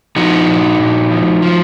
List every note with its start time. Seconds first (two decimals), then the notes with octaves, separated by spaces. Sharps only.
0.16 F3 D#4 F#4
0.48 A#2
0.79 A#2
1.10 F3
1.42 F3